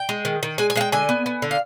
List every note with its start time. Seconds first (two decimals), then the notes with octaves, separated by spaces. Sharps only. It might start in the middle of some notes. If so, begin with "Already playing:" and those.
Already playing: G5
0.09 G#3
0.25 D#3
0.43 D#3
0.58 G#3 G#5
0.70 G#5
0.76 G#3 F5
0.81 G5
0.92 D3 G#5
1.09 B3
1.26 B3
1.42 D3
1.51 F5